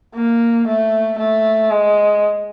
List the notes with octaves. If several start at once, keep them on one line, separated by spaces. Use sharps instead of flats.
A#3
A3
A3
G#3